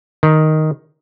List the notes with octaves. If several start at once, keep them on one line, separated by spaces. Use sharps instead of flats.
D#3